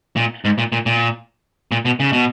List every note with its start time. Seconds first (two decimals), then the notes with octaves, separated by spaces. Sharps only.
0.16 A#2
0.45 G#2
0.58 A#2
0.72 A#2
0.86 A#2
1.72 A#2
1.85 B2
2.00 C#3
2.13 B2